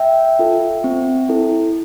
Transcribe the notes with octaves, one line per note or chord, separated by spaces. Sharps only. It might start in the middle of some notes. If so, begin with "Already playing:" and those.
Already playing: E5 G5
F4 A4
C4
E4 A4